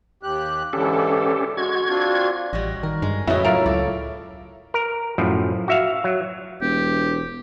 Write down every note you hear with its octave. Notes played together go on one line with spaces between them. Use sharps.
D#2 G4 F#6
G#2 D3 E3 C#4 G4 A4
G#3 F#4 G#6
C4 D4 F4
A1 G3 F#4 D#5
D#3 A#4
G2 G#3
F2 A2 C#3 E4 F#4 D#5
F#3 F4 A#4
C#2 A4 D5
A#4
F#2 A2 F3
F#4 E5 F5
F#3
E1 G4